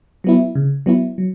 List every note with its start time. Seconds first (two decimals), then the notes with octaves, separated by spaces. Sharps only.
0.24 F#3 B3 E4
0.55 C#3
0.86 F#3 B3 E4
1.18 F#3